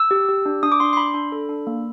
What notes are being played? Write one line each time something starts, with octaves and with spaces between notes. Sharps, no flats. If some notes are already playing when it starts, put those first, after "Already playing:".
Already playing: E6
G4
G4
D4
D4 D#6
D6
D4 C6
C6
D4 B5
D4
A4
D4
A#3